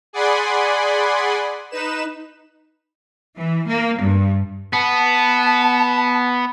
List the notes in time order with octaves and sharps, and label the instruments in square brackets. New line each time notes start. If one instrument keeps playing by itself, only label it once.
[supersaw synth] G#4 D5 F#5 G#5 B5 C6
D#4 B4 E7
[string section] E3
A#3
G2
[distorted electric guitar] B3 [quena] A5